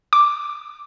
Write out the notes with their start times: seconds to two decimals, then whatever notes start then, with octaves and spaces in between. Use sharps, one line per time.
0.13 D6